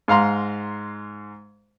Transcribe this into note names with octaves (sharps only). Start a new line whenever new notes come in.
G#2 F5 A#5 C6